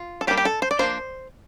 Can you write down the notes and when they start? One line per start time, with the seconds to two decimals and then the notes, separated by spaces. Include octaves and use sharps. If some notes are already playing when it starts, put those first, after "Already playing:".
Already playing: F4
0.21 A4
0.27 G3 A#3 D4 G4
0.37 G4
0.45 A4
0.62 C5
0.71 D5
0.79 F3 A#3 D4 C5